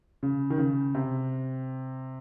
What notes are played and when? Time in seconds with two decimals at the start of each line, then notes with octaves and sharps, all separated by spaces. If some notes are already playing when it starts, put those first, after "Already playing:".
0.23 C#3
0.50 D#3
0.58 C#3
0.95 C3